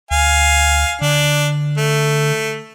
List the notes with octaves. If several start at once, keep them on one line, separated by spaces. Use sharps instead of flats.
D2 F5 G#5
D3 D4
A3